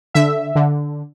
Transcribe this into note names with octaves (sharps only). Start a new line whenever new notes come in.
D3 E5
D3